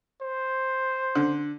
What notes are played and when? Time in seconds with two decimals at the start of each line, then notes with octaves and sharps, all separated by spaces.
0.22 C5
1.15 D3